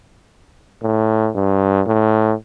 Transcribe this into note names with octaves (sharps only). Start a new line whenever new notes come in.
A2
G2
A2